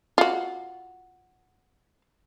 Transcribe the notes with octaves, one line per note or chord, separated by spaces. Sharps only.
F4 F#4